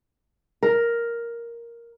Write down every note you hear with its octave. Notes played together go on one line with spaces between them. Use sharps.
A#4